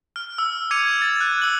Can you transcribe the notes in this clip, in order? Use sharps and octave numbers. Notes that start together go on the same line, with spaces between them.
F6
E6
D6 G#6 C#7 D#7 F7
A6
F#6
E6 F#7